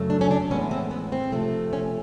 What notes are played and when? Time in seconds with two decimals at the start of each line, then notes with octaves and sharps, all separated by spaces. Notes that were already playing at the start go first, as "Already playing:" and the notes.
Already playing: F#2 C#3 F#3 A3
0.10 D4
0.21 C#4
0.31 D4
0.51 A2 E3 G#3 B3 C#4
0.71 C4
0.91 B3
1.12 C4
1.32 C3 F3 A3
1.73 C#4